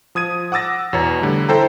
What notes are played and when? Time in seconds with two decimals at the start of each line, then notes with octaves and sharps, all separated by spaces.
0.15 F3 D#6 G#6 D#7
0.52 F#5 D6 E6 A6 A#6
0.93 E2 B2 B4 C#5 A#5 A6
1.21 D3 G3 A3
1.49 E4 A4 C5 G5 A#5